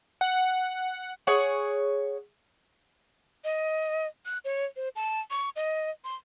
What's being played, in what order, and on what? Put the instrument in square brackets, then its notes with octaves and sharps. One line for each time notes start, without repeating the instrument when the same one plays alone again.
[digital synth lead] F#5
[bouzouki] G#4 C#5 F#5
[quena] D#5
F#6
C#5
C5
A5
C#6
D#5
C6